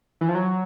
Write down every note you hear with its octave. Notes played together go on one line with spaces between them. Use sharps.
E3
F3
F#3